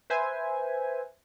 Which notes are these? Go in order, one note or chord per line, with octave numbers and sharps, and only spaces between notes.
B4 C5 E5 G#5